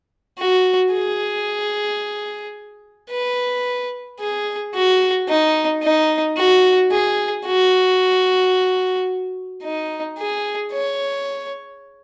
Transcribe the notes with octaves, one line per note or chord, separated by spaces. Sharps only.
F#4
G#4
B4
G#4
F#4
D#4
D#4
F#4
G#4
F#4
D#4
G#4
C#5